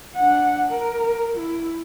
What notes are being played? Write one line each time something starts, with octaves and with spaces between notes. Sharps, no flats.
D4 F#5
A#4
E4